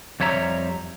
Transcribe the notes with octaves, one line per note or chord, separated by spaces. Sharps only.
F2 G3 C#5 E5 A#5